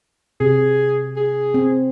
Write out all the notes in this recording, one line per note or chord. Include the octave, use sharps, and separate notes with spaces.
C3 G#4
G#4
C4